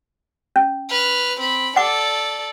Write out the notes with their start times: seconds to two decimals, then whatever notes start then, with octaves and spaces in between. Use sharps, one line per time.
0.56 C#4
0.90 B4 F6
1.40 C4 B5
1.76 A4 D5 F#5 D6